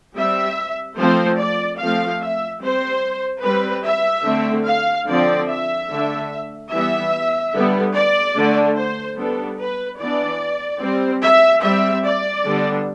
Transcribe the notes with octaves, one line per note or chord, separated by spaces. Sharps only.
G3 C4 E5
F3 A3 C4 C5
D5
F3 A3 C4 F5
E5
G3 C4 C5
G3 C4 B4
E5
D3 A3 C4
F5
D3 F3 C4 D5
E5
D3 A3 D4
E3 G3 B3 E5
D3 G3 B3
D5
D3 A3 D4
C5
G3 B3 D4 A4
B4
E3 B3 D4 D5
G3 C4
E5
G3 C4 E5
D5
D3 G3 B3 D4